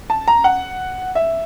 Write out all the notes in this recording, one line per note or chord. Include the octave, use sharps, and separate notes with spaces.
A5
A#5
F#5
E5